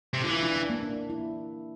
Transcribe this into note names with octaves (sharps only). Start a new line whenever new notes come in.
C3
D3 F4
E3 E4
D4
D4
A#3
D4
E4